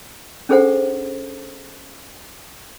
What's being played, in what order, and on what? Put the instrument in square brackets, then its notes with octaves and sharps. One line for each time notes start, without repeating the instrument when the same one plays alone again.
[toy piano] C#4 D4 G#4 A4 C5 F#5